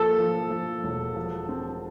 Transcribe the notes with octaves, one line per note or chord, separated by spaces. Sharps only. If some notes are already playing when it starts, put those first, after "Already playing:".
Already playing: F3 A#3 A4
F3
F3
E1
F3
C4